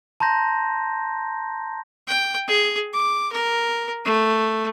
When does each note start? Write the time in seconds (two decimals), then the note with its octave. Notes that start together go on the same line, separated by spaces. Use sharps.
0.20 A5 A#5 C6 G6 A#6
2.07 G5
2.48 G#4
2.93 D6
3.32 A#4
4.05 A3